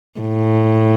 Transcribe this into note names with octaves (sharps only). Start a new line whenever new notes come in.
A2